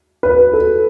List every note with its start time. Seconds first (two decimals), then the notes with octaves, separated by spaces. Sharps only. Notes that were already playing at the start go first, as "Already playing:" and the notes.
0.23 B4
0.53 A4